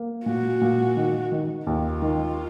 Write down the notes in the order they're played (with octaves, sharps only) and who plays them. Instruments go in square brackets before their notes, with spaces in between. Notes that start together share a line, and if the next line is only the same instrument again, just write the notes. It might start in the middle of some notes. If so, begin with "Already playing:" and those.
Already playing: [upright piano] A#3
[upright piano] A#2 [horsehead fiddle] F#4
[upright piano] A#2
D#3
D#3
[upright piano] D#2 [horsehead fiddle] F4
[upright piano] D#3